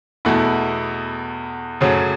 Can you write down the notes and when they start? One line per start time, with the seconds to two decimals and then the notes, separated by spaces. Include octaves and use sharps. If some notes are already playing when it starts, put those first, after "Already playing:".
0.25 E2 B2 A3 E4
1.81 F#2 C#3 F#3 A3